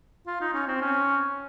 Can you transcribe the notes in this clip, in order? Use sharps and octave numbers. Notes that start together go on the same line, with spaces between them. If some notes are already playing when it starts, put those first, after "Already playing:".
F4
D#4
C#4
C4
C#4